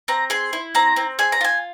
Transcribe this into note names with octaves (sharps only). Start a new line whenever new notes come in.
C4 A#5
G#4 C6
E4
C4 A#5
C4
G#4 G#5
A#5
F4 G#5